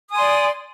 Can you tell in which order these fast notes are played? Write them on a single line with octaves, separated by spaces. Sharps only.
D#6 G#5 C6 D5